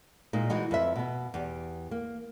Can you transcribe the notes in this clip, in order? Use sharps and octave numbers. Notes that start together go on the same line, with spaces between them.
A#2 G#3 D#4
E3 G#3 D#4 F#4
F2 B4 E5
B2 B3
E2 G4
A#3